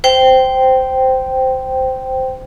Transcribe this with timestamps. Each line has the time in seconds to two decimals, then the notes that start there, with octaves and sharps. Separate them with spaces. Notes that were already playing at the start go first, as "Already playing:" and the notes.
0.04 C5 G5